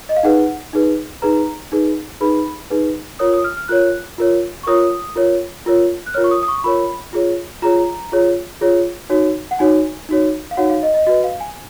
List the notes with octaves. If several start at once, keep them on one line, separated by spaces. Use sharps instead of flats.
D#5
F5
D#4 G#4 B4 F#5
D#4 G#4 B4
D#4 G#4 B4 A#5
D#4 G#4 B4
D#4 G#4 B4 B5
D#4 G#4 B4
F4 A#4 C#5 D#6
D#6
F6
F6
F4 A#4 C#5 F#6
F4 A#4 C#5
C#6
F4 A#4 C#5 D#6
F4 A#4 C#5
F4 A#4 C#5
F#6
F4 A#4 C#5 F6
C#6
D#6
D#6
C#6
C#6
F4 A#4 C#5 B5
F4 G#4 C#5
F4 G#4 C#5 A#5
F4 G#4 C#5
F4 G#4 C#5
D#4 F#4 C#5
F#5
D#4 F#4 C#5 G#5
D#4 F#4 C#5
F5
D#4 F#4 C#5 F#5
F5
D#5
D#5
F#4 B4 D#5
F5
G#5